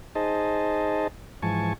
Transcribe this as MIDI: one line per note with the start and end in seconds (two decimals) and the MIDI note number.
0.15 1.07 63
0.15 1.07 68
0.15 1.07 72
0.15 1.07 75
0.15 1.07 81
1.42 1.73 44
1.42 1.73 52
1.42 1.73 53
1.42 1.73 80
1.42 1.73 81
1.42 1.73 85